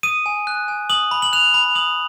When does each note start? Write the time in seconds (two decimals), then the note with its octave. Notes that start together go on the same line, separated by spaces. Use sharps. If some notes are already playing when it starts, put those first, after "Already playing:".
0.03 D#6 D#7
0.26 G#5
0.47 F#6
0.68 G#5
0.90 D#6 F#7
1.11 B5
1.22 F#7
1.33 F#6 F7
1.54 B5
1.75 D#6 F#7